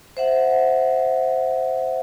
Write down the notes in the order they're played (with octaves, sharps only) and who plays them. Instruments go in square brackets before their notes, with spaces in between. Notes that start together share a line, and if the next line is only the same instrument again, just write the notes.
[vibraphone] C5 E5 F#5